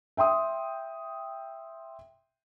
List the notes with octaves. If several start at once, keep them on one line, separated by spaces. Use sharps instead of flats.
E5 G5 C6 D#6